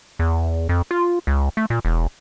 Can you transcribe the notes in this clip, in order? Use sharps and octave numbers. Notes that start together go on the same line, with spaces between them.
E2
F2
F4
C#2
A3
A#2
E1